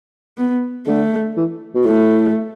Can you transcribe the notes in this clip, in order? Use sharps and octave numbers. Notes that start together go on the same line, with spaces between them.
B3
D3 A3
E3
B2
A2 A3